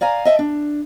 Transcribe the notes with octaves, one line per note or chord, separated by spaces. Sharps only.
D5 F5 G#5 A#5
D#5 E5 G5 A5
D4